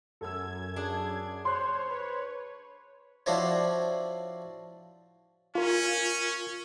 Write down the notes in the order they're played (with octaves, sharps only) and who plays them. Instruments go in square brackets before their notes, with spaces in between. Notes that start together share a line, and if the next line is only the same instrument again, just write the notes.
[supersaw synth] F#2 G#6 [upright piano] A4 E6
[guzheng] D4 G#4
[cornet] C5 [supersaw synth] C#5 [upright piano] C6 F#6
[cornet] B4 [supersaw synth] C#5
[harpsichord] F3 D4 E4 F#4 C5 C#5
[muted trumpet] C#4 [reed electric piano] F4 A#4